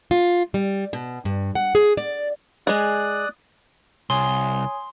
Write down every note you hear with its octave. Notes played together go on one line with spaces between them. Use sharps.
F4
G3
B2
G2
F#5
G#4
D5
G#3 G#4 D5 D#6 F#6
C2 C#5 G#5 C6 D#6